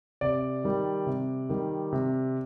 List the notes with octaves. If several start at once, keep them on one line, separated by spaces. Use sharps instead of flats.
C3 D5
D#3 G3
C3
D#3 G3
C3